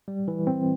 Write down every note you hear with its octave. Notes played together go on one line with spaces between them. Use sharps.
G3
E3
C4